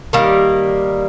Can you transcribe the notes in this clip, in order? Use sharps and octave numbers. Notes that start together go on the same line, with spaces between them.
D#3 G3 A#3